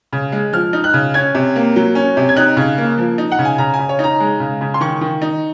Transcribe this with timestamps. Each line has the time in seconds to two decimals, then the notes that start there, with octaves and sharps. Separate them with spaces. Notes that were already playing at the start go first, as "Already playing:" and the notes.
0.13 C#3
0.32 G#3
0.53 F3 F6
0.73 D#4
0.84 F#6
0.94 C#3
1.14 C#4 G#6
1.35 C3
1.56 A#3
1.76 F#3
1.95 C#4
2.17 C3
2.29 G#6
2.36 D#4 F#6
2.57 C#3
2.78 A#3
2.98 F3
3.18 D#4
3.32 F#5
3.39 C#3
3.45 G#5
3.58 C#3 A#5
3.74 G#5
3.79 C#3
3.89 C#5
3.99 D#4
4.04 A#5
4.20 G#3
4.40 C#3
4.61 C#3
4.74 C6
4.81 D#3 C#6
5.01 D#3
5.22 D#4